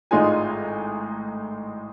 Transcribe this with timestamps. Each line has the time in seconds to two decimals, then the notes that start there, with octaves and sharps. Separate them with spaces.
0.11 G#1 A2 G#3 D#4 F4 G#5